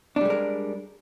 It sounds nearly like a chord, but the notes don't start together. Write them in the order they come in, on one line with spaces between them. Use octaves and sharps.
D4 G3 G#3 A#4